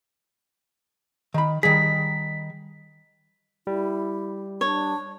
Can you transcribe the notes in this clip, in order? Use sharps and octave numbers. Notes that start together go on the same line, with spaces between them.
D#3 B5
D#3 G3 G#4 B6
G3 E4
D4 C#5